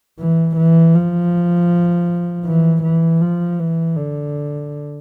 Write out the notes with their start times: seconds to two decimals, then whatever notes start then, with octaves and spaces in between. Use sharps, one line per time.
0.19 E3
0.57 E3
0.95 F3
2.46 E3
2.83 E3
3.21 F3
3.60 E3
3.97 D3